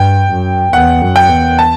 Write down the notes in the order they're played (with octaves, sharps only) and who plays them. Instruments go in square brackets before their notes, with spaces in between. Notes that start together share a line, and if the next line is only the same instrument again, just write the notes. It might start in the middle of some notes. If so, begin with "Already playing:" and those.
Already playing: [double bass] G2 [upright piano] G5
[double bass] F#2
[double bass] E2 [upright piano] F#5
[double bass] F#2
[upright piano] G5
[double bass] E2
[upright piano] A5